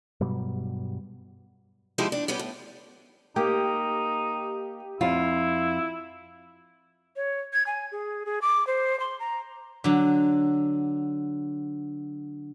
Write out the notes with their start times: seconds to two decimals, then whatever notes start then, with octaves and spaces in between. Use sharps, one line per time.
0.20 G2 B2 F#3 G3
1.98 F3 G#3 D#4 E4 G4
2.12 D4
2.28 G3 B3 C#4 G4
2.39 A2
3.36 A#3 D#4 G4
5.01 F2 E4 F4
7.16 C#5
7.53 G#6
7.67 G#5
7.92 G#4
8.26 G#4
8.42 D6
8.67 C5
9.00 C6
9.20 A#5
9.84 D3 F#3